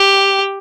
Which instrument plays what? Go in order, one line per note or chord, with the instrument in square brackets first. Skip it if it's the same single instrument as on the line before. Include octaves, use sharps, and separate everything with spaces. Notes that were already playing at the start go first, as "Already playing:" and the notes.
Already playing: [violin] G4